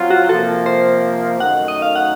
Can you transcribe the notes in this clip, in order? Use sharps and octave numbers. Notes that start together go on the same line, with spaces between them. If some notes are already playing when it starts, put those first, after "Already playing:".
Already playing: F#3 C4 F4
F#4
F#4
C3 F3 A#3 A4
C5
F#2 D#3 A3 D#4 F#5
D#5
F5
F#5